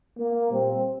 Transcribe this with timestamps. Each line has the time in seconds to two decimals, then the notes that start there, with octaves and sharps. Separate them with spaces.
0.18 A#3
0.50 A#2 G3 C4